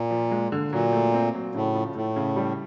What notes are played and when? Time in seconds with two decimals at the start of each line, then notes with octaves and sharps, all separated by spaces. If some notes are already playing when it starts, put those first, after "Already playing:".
Already playing: A#2
0.11 F3
0.31 G#3
0.52 D3
0.72 A#2 F#3
0.93 A3
1.14 C4
1.35 F#3
1.54 A2 C#3
1.75 F3
1.95 A2 A3
2.16 C#3
2.36 G3